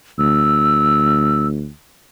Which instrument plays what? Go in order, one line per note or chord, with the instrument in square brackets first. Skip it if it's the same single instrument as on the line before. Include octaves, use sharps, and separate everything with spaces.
[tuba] D2 [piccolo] E6